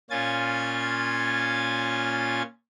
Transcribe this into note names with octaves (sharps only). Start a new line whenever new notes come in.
A#2 C#4 F4 G#5 G#6 A6